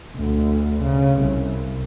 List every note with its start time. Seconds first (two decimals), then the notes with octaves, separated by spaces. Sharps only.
0.17 D2
0.83 C#3
1.21 C2